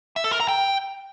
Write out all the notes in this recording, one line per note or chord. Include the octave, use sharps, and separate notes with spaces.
E5
A4
A#4
A#5
G5